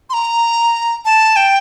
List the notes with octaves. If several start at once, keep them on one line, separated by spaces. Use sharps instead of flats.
C6
A#5
A5
G5